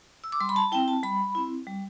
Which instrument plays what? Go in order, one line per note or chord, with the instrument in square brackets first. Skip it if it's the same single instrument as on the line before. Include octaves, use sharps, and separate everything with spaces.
[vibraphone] E6
D6
G3 C6
B5
A5
C4 E4 G5
A5
G3 B5
C4 E4
G3